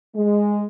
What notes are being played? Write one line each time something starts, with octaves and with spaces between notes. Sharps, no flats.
G#3